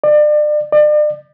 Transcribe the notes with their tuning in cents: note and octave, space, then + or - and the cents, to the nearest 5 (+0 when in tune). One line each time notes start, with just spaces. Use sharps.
D5 +35
D5 +40